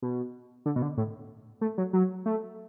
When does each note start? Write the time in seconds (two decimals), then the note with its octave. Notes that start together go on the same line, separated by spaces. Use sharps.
0.02 B2
0.66 D3
0.76 B2
0.82 D3
0.98 A2
1.61 A3
1.78 F#3
1.93 F#3
2.26 A3